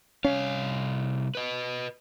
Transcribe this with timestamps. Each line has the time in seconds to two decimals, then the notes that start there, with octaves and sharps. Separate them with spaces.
0.25 C2 C#4 F5
1.35 B4 D#5